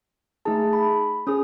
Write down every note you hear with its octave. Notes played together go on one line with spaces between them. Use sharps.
A3 D#4 G#4 A5
B5
C#4 G#4 D#6